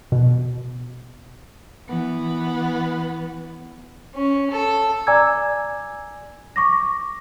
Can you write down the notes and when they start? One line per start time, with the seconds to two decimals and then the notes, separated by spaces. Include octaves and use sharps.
0.12 B2
1.88 E3 B3
4.15 C#4
4.51 A4
5.07 D5 G#5 A#5 D6 E6 G#6
6.56 C#6 D6 A#6